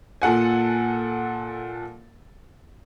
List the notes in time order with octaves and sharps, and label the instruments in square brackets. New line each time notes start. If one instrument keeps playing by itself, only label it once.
[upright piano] A#2 A4 F#5 G#5